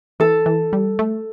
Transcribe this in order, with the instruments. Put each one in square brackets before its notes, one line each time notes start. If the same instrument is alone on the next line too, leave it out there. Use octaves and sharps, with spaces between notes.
[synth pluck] E3 [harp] A4
[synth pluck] E3
G3
A3